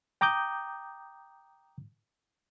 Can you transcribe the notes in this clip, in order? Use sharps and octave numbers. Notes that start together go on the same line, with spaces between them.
G5 A#5 D6 D#6 G6